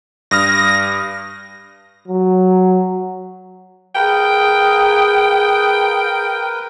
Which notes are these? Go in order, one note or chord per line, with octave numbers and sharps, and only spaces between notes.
G2 D#6 F6 A#6
F#3
G#4 A#4 B4 G5